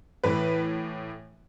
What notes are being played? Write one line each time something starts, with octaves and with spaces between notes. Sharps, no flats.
A2 E3 B4